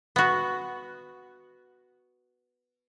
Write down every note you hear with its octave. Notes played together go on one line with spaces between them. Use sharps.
B3 F#4